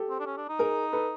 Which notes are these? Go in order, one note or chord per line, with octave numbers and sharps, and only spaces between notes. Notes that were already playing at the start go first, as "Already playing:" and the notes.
Already playing: G4 A4
C4
D4
C#4
D4
D#4
G#4 A#4
A4 B4